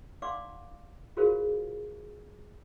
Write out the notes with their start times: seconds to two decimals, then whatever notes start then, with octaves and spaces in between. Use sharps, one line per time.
0.22 D#4 D5 F5 F#5 C6 D6
1.17 F4 F#4 G#4 A#4 C5 F5